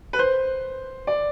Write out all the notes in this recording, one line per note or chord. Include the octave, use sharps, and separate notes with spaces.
B4
C5
D5